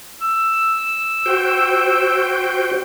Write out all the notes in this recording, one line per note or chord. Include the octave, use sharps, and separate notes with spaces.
E6
F#4 C5 G5